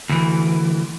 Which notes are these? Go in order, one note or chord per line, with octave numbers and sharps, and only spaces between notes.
D2 E3